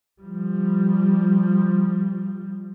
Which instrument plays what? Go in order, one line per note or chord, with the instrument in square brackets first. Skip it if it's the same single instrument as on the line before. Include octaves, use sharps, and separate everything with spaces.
[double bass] F3 G3